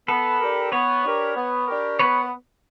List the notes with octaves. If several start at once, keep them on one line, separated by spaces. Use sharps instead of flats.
B3 A4 B4
D4 G4 A#4
B3 B4 C#5
D4 G4 A#4
B3
D4 G4 A#4
B3 B4 C#5